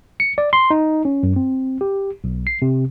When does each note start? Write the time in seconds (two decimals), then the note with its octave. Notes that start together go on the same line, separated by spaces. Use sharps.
0.20 C#7
0.38 D5
0.53 C6
0.71 D#4
1.05 C#4
1.23 F#2
1.36 C4
1.81 G4
2.24 B1
2.47 C7
2.62 C3